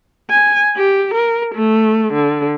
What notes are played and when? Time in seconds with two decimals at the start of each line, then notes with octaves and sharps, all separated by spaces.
0.30 G#5
0.76 G4
1.14 A#4
1.55 A3
2.14 D3